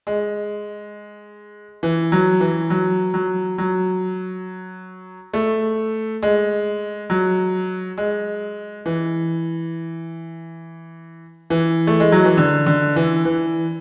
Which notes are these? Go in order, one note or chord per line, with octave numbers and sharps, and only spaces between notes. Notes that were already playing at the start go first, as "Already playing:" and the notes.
G#3
E3
F#3
E3
F#3
F#3
F#3
A3
G#3
F#3
G#3
E3
E3
A3
G#3
F#3
E3
D3
D3
E3
E3